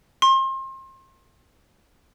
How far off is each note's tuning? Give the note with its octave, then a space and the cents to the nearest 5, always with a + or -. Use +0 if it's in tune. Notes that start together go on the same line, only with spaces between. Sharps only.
C6 +35